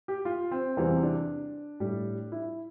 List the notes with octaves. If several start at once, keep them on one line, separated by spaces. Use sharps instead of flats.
G4
F4
C4
E2 C3 E3 G3 C4
D4
A2 G3
E4